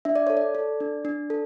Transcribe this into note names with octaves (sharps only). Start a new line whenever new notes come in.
D4 E5
D5
A4 C#5
D5
A4
D4
D4
A4